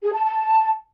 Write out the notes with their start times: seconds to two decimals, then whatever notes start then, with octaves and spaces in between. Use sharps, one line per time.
0.03 G#4
0.13 A5
0.24 A5